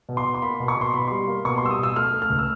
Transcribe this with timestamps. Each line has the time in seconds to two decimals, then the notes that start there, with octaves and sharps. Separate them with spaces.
0.09 B2
0.17 C6
0.25 B2
0.34 C6
0.42 A#3 B5
0.60 B2
0.68 C#6
0.76 B2 C6
0.94 B2 B5
1.07 G3 C6
1.28 A#3
1.45 B2 C#6
1.58 C6
1.62 G3 E6
1.70 D#6
1.79 B2 E6
1.96 A3 F6
2.13 A3
2.22 F6
2.30 C#2
2.39 E6